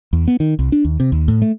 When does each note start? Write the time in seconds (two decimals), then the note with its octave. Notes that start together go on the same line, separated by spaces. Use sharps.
0.13 E2
0.28 B3
0.40 D#3
0.59 C2
0.72 D4
0.85 D#2
1.00 C3
1.12 D#2
1.28 A2
1.42 A3